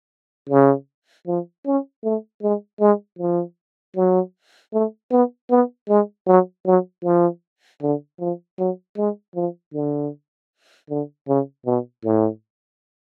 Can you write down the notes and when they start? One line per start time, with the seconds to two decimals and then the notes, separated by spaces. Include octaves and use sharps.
0.49 C#3
1.27 F3
1.66 C#4
2.03 A3
2.42 G#3
2.80 G#3
3.19 F3
3.96 F#3
4.73 A3
5.11 B3
5.50 B3
5.89 G#3
6.27 F#3
6.66 F#3
7.04 F3
7.82 D3
8.20 F3
8.58 F#3
8.97 G#3
9.35 F3
9.74 D3
10.90 D3
11.28 C#3
11.66 B2
12.04 A2